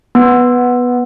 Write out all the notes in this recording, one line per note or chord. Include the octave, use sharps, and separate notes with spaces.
B3